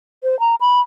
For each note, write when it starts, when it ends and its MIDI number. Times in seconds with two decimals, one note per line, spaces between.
0.23 0.38 72
0.40 0.55 82
0.61 0.80 83